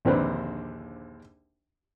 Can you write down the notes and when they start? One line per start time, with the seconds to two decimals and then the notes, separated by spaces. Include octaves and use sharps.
0.05 A#1 D#2 D3 C4 B4 C5